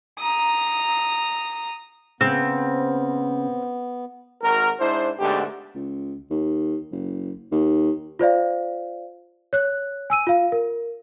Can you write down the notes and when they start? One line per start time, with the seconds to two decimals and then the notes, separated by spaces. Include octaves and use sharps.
0.19 A#5 D#6
2.21 C#3 B3 C4
4.42 G#1 F#4 A#4
4.80 G#2 D4 E4 C5
5.19 G#2 B2 D3 A3 G4
5.75 C#2
6.31 D#2
6.92 F#1
7.52 D#2
8.19 F4 C5 D5 F5
9.53 C#5 F#6
10.10 G#5 E6 D#7
10.27 F4 F5
10.52 A#4